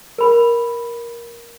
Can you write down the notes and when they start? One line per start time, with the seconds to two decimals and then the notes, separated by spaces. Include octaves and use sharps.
0.18 A#4 B5